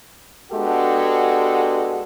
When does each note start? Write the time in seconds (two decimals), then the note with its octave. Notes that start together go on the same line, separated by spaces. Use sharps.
0.52 G#3 B3 D4 F#4 G4 A4